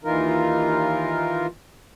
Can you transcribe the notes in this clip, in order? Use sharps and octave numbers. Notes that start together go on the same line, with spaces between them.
D#2 E3 D#4 F4 A#4